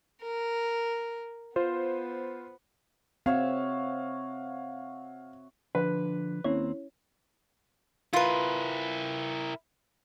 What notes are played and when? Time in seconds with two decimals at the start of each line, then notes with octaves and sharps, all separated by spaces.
0.22 A#4
1.56 B3 F4 C5
3.26 C4 F#4 C#5 E5 F5
5.75 D3 F3 D4 B4
6.44 D#2 A#3 C4 C#4 E4 C#5
8.13 E4 F4 A#4 B4